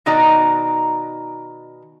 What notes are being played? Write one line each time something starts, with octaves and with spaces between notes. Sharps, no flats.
B2 D#3 D#4 F#4 D5 A#5